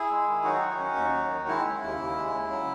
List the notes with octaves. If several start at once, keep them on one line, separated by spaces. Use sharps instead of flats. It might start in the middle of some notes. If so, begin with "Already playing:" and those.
Already playing: E4 G#4
G#3
D#3
F#3 D#4 F#4
D#3
C#4
D#2
F#3
D#3
G#3 E4
C#3
D#2
D#2
G#3
C#3
F#3